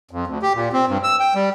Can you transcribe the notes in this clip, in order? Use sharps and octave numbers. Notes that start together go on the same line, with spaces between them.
F2
D2
G4
A#2
C4
G2
E6
G5
G3